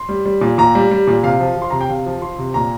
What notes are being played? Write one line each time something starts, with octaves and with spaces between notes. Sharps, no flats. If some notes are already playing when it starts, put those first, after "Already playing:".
Already playing: C6
G3
G3
A#2
A#2 A#5
G3
G3
A#2
C3 F5
F3
F3
C6
C3 A#5
G5
C3 F5
F3
F3 C6
C3
A#2 A#5